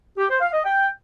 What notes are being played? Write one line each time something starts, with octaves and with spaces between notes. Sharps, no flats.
G4
C5
F5
D#5
G5